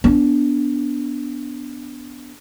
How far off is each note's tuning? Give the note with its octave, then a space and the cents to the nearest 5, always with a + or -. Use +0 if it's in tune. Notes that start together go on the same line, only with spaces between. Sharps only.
B3 +0 D4 -15